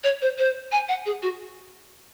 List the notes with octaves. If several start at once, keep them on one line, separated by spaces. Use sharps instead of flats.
C#5
C5
C5
G#5
F#5
G#4
F#4